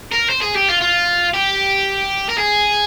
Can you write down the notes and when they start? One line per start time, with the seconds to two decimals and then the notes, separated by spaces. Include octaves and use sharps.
0.12 A#4
0.29 C5
0.41 G#4
0.55 G4
0.68 F4
0.81 F4
1.34 G4
2.29 A#4
2.38 G#4